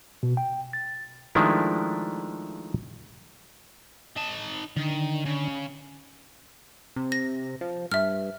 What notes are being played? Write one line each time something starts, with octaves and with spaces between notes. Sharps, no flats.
B2
G5
A6
D#3 F3 G#3 A3 D4 E4
D#4 A5
D3 D#3
C#3
C3
A#6
F3
G2 E5 F6